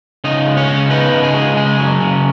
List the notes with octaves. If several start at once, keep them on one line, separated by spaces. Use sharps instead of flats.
C#3 D#4 D#5
G#3
C#4 C#5
C#3
B3 D#4 B4
C#3
G#4
G#3
C#3 G#4
F#3
C#3